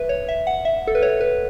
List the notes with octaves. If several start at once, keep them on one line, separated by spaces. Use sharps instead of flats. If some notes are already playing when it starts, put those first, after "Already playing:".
Already playing: B4 E5
C#5
E5
F#5
E5
A4
B4
C#5
B4